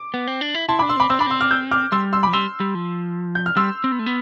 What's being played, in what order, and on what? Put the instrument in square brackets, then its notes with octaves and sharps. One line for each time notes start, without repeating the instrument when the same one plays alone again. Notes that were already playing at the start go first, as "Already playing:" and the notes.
Already playing: [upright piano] D6
[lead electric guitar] B3
C4
D4
E4
[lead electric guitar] E4 [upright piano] A5 C6
[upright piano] B5 D6
[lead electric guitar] D4
[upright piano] C6 E6
[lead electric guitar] C4 [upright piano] B5 D6
[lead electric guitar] C4 [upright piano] C6 E6
[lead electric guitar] D4 [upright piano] B5 D6
[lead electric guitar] C4 [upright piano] C6 E6
[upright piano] D6 F6
E6 G6
D6 F6
[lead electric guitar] G3 [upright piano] C6 E6
[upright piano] C6 E6
B5 D6
[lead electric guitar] F3
[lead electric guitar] G3 [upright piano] C6 E6
[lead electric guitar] G3
F3
[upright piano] G6
F6
[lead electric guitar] G3 [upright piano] C6 E6
[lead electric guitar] C4
B3
A3
B3